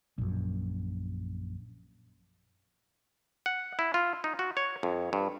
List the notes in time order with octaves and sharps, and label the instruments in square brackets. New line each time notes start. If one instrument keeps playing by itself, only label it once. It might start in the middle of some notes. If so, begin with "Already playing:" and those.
[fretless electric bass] A#1 F#2
[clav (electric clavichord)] F#5
E4
F4
D#4
F#4
C#5
F2
G2